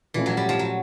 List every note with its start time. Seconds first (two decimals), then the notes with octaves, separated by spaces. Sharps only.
0.14 A#2 E3 F3 A3 C#4
0.26 F#3
0.37 G3
0.49 F3
0.59 F#3